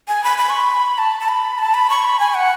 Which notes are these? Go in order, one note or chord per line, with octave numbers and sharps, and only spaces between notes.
G#5
B5
B5
C#6
B5
A5
A5
B5
A5
B5
C#6
B5
G#5
F#5